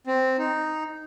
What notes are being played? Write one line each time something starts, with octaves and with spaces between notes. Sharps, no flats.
C4
D#4